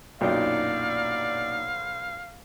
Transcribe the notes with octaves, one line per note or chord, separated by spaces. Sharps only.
B1 F#2 A#2 D4 D#4 D5 F5 G5